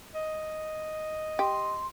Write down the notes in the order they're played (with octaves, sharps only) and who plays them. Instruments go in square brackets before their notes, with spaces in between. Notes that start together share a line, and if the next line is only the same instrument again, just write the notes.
[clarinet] D#5
[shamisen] G4 [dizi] C6